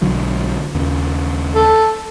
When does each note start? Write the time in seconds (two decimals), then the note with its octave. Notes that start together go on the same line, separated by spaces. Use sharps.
0.02 B1 D3 F#3
0.75 D#2 C#3
1.54 A4